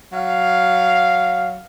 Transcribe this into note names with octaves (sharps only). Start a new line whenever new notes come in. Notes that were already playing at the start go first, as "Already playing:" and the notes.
F#3 F5